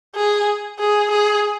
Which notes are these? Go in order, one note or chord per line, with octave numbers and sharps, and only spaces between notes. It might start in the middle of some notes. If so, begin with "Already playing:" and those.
G#4
G#4
G#4